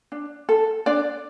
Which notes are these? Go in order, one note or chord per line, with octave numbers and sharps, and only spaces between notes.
D4
A4
D4 D5